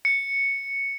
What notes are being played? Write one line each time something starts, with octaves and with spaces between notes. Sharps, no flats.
C#7